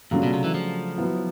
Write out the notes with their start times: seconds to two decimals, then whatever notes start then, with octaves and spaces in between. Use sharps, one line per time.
0.11 G2 C#3 F#3 A3 D4 F4
0.23 B2
0.34 C3
0.44 E3
0.54 F3
0.98 F#3 B3 E4